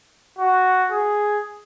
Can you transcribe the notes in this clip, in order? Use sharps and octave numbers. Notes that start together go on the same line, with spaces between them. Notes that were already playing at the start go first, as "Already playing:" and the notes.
F#4
G#4